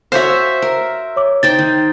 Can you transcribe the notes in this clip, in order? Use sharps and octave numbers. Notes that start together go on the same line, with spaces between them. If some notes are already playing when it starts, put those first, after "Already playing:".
F#4 C5 C#5 E5 F5 G#5 G6
A#4
C#5 D6
D#4 C5 G5 A6
D#3